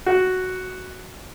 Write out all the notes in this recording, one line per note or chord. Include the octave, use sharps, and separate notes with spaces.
F#4